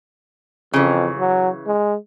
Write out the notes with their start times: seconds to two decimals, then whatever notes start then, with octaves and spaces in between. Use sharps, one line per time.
0.73 F2 C#3 E3
1.19 F#3
1.67 G#3